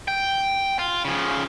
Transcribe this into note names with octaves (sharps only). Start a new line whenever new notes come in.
G5
F4
C#3 F3